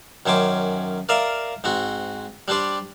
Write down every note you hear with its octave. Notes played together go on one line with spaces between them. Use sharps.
F#2 D#3 C#4 C5 D6
A#4 D5 E5 F5 A#5
G#2 C4 F#4
G3 D4 G4 C5 D5